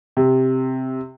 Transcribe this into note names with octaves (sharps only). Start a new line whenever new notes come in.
C3